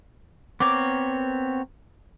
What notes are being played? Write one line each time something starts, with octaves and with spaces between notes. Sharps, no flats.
B3 C4 A#4 C#5 D6